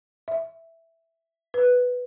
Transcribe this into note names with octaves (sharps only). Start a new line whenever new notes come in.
E5
B4